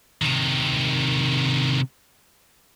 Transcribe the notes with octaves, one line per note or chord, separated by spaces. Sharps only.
C3 D#3